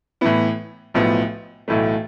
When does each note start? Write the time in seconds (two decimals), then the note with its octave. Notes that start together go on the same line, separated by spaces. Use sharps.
0.21 A2 E3 B3 E4
0.94 B1 A2 F3 B3
1.68 B1 A2 E3 A3